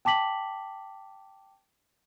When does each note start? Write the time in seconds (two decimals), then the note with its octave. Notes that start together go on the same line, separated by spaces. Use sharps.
0.05 G5 A5 D6 B6 F#7